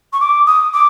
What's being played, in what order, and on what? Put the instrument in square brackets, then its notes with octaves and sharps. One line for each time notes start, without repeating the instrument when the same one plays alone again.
[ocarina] C#6
D6
D#6
D6